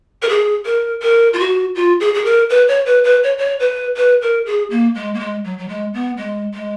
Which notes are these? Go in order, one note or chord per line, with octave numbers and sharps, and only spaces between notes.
A#4
G#4
A#4
A#4
F4
F#4
F4
G#4
G#4
A#4
B4
C#5
B4
B4
C#5
C#5
B4
B4
A#4
G#4
A#3
G#3
A#3
G#3
F#3
F#3
G#3
B3
G#3
G#3